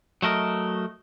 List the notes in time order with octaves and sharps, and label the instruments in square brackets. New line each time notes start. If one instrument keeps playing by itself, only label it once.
[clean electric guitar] F#3 A3 A#4 D#5